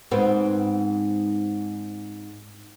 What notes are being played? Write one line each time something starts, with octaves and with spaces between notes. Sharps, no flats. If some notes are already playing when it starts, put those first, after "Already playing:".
G#2 B3 C4